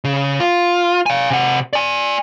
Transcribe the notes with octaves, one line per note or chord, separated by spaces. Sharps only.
C#3
F4
F5 G#5
C3 F#5
D5 G#5